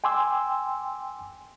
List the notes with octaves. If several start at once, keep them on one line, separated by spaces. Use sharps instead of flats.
G5 G#5 C6 D6 E6